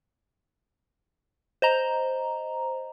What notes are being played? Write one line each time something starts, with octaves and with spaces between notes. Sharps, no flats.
C5 D#5 A#5